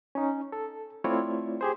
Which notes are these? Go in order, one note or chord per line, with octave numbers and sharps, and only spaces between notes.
C#4 D#4
A4
A3 C4 E4 F4 C#5 D5
G4 G#4 C5